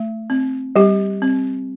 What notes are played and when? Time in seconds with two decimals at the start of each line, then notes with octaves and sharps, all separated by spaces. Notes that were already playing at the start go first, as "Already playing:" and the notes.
Already playing: A3
0.30 C4
0.76 G3 G4
1.22 C4